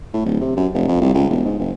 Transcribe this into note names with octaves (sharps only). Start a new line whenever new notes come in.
A2
D1
C3
F#2
F1
F2
C2
C#2
E1
G#2
F#1